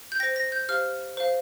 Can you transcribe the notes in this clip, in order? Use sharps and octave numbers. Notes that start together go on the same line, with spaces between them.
G6
C5 G5 A#6
A#6
G6
G4 C5 F5 F6
C5 F5